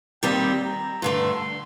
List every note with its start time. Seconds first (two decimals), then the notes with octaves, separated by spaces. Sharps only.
0.23 D#2 D#3 G3 C4 G5
0.63 A#5
1.02 G2 D3 A3 C6